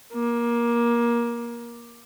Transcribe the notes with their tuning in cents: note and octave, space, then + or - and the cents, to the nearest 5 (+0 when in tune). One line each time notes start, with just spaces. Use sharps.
A#3 +20